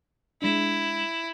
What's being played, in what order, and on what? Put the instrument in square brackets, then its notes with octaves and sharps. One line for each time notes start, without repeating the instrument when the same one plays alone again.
[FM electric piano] G#3 D4 [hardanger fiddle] E4